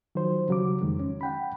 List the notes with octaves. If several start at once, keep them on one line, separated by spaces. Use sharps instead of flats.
D#3 F3 F#3 C5
C#3 F#3 G3 D6
F2 D#3 G#3
C#4
F#5 G5 B5